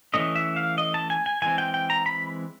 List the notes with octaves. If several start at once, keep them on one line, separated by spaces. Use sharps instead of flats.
E3 A3 C#4 D#5
E5
F5
D#5
A5
G#5
G#5
E3 G#3 C4 G#5
G5
G5
A#5
B5